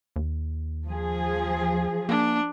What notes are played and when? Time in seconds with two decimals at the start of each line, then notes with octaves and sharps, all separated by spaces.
0.16 D#2
0.88 F3 G#4
2.09 A#3 D4